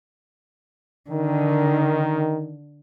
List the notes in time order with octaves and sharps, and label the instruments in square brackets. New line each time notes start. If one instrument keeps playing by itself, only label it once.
[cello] D3 [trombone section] D#3